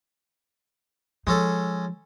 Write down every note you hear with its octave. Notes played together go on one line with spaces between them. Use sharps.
F3 G#3 C#4 A4